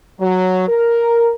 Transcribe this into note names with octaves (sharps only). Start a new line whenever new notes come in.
F#3
A#4